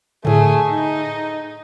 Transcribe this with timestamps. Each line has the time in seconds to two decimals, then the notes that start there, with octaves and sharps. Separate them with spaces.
0.25 A2 D3 A3 G#4
0.70 D#4